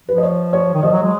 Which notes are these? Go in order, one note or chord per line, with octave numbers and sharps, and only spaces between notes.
F3 B4
D#5
C#5
C#5
D#3
F3 D#5
F#3
G#3